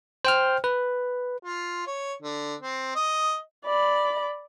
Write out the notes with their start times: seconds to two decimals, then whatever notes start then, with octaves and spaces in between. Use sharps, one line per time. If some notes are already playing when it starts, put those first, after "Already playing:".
0.25 C5 G5 F6
0.64 B4
1.43 F4
1.87 C#5
2.22 D3
2.60 C4
2.95 D#5
3.65 D5 B5